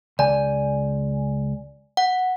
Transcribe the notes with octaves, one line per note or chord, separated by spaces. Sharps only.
C#2 D5 G#5
F#5